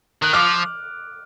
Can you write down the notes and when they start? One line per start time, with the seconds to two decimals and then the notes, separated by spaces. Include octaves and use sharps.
0.22 D#3 F#6
0.33 F3 D6 F6